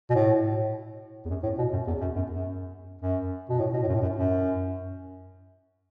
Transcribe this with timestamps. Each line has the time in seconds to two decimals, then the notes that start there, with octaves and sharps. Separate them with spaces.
0.10 B2
0.15 A2
1.25 E2
1.30 F#2
1.44 A2
1.59 B2
1.73 F#2
1.87 E2
2.01 F#2
2.16 F#2
2.30 F#2
3.02 F#2
3.50 B2
3.59 A2
3.74 B2
3.83 A2
3.88 F#2
3.95 A2
4.02 F#2
4.16 F#2